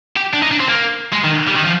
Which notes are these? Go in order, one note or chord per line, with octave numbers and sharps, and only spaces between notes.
G4
D4
D#4
D4
C4
A#3
G#3
D#3
G3
D#3
F3